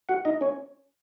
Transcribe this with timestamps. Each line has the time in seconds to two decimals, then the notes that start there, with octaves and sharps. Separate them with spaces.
0.09 F#4 F#5
0.25 D#4 D#5
0.41 C#4 C#5